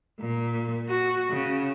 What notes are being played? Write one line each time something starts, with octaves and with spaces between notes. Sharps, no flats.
A#2
F#4
C#3